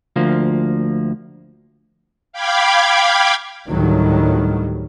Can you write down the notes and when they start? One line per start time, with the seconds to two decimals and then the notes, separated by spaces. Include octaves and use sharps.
0.16 D2 F3 A#3
2.33 F5 G5 B5 D6 G#6
3.70 D2 A2 D#3 F#3 G3